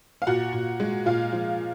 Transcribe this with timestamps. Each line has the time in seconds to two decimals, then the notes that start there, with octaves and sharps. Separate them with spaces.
0.22 F5
0.27 A#2 F#4 F#5
0.53 A#2
0.80 G#3
1.06 A#2 F4 F5
1.33 F3